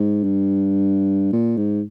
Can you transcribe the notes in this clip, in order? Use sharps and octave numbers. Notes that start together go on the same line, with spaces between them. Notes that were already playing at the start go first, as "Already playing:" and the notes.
Already playing: G#2
G2
A#2
G#2